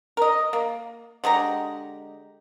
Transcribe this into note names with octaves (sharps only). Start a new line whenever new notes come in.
A#4 D#5
A#3
D3 G#3 G4 A#5